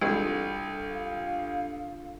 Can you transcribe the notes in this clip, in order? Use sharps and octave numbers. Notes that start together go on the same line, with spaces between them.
C2 E3 G#3 D4 F4 A4
F5